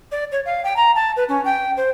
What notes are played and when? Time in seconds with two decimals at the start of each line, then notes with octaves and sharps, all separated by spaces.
0.11 D5
0.32 C#5
0.45 F5
0.64 G5
0.76 A#5
0.95 A5
1.16 B4
1.28 C#4
1.45 G5
1.77 C5